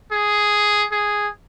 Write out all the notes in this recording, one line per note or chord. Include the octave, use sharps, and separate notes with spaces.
G#4
G#4